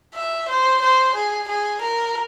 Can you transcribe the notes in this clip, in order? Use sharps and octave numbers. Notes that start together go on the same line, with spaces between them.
E5
C5
C5
G#4
G#4
A#4